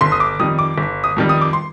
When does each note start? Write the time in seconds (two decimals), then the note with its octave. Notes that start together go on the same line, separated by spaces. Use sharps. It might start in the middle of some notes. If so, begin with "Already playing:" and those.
0.01 G1 C6
0.12 D#6
0.20 D6
0.39 F2 D#3 G3 D#6
0.59 D6
0.78 G1
1.04 D#6
1.17 F2 D#3 G3
1.29 D#6
1.41 D6
1.53 C6